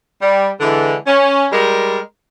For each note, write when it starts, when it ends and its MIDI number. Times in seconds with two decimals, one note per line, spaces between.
0.21 0.49 55
0.60 0.96 50
0.60 0.96 52
0.60 0.96 56
1.07 1.46 61
1.52 1.99 55
1.52 1.99 56
1.52 1.99 70